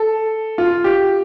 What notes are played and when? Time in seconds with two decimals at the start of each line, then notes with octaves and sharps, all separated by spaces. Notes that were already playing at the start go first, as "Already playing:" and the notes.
Already playing: A4
0.58 F4
0.84 G4